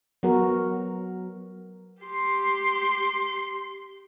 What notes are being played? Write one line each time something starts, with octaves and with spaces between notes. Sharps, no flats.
F#3 B3 F#4 A#4
G4 C6